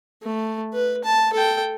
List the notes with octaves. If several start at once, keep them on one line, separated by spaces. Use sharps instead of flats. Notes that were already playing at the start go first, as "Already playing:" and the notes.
A3
B4
A5
A4 G5